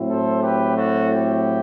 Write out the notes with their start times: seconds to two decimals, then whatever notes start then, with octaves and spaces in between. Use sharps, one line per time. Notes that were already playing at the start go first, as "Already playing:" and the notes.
Already playing: A2 F#3 C4 E4
0.09 A4 C5
0.43 G4 B4
0.75 F#4 A4
1.10 G4